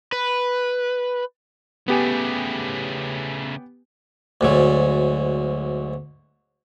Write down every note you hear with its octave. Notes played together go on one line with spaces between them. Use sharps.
B4
C#3 A3 B3 G4 G#5
D2 G#2 F#3